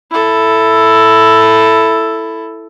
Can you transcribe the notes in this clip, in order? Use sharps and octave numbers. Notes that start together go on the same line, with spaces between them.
E4 A4